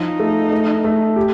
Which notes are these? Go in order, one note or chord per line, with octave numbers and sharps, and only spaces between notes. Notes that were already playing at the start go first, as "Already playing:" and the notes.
Already playing: F3 D#4
A3
A3
A3
G4